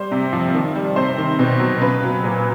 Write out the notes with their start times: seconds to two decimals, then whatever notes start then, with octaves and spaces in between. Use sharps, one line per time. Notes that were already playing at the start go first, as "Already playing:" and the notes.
Already playing: G3 C5
0.11 C3
0.33 F3
0.55 D#3
0.76 G3
0.96 C3 C5
1.18 D#3
1.39 B2
1.60 F#3
1.81 C#3 B4
2.03 F#3
2.24 A#2